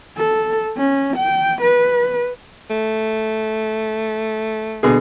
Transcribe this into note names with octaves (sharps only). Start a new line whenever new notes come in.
A4
C#4
G5
B4
A3
B2 D3 G#4